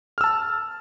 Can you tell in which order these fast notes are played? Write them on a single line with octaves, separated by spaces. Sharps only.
F6 E6 A5